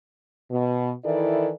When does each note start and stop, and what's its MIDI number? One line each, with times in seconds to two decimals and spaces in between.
0.51 0.91 47
1.05 1.51 51
1.05 1.51 52
1.05 1.51 64
1.05 1.51 69
1.05 1.51 74